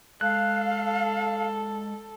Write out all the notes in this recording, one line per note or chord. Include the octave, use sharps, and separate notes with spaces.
G#3 A4 F5 F#6